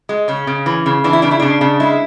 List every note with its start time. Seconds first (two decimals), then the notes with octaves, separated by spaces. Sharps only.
0.09 G#3
0.28 C#3 C#4
0.47 C#3
0.66 E3
0.86 C#3
1.04 E3 D4
1.13 E4
1.22 C#3 D4
1.31 E4
1.40 C#3 D4
1.61 C#3
1.80 G#3 E4